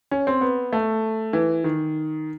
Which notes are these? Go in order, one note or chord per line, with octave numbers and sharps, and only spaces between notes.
C#4
C4
B3
A3
E3
D#3